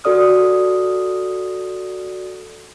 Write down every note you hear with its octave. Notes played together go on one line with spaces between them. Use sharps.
F#4 A4 D5 D#6 F6